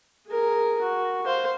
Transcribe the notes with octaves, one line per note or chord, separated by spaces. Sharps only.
G#4 A#4
F#4
C5 F5